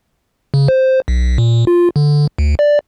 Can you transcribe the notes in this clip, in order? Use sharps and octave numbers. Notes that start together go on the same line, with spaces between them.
C#3
C5
B1
A#2
F4
D3
D2
D5